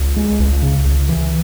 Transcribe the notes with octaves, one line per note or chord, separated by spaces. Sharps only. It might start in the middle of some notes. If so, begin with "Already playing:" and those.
Already playing: C#2
G#3
C#2
C#3
C#2
E3